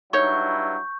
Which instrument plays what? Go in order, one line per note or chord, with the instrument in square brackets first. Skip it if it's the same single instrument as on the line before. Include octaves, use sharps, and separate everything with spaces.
[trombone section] G2 F#3 E4 [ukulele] D#4 C#5 [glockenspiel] C#6 G6